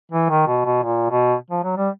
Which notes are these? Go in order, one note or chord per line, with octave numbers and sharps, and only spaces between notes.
E3
D#3
B2
B2
A#2
B2
F3
F#3
G3